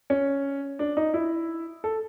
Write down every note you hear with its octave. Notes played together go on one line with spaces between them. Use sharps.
C#4
D4
D#4
E4
A4